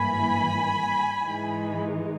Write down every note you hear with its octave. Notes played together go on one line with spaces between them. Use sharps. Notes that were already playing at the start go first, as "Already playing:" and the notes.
Already playing: G#1 G2 E3 A#3 G#5 B5
G#2 E3 G#3 D#4